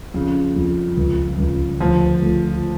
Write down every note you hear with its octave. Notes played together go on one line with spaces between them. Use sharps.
F2 C#3
F2
C#2
C#2
D2 F3
A3